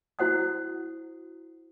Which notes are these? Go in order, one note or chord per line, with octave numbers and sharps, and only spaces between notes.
E4 F#4 C5 F#5 D#6